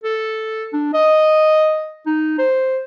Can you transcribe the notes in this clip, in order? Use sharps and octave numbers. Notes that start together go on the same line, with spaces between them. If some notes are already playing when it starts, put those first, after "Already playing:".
A4
D4
D#5
D#4
C5